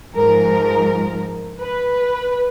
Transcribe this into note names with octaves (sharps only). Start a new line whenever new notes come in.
G#2 F3 A#4
B4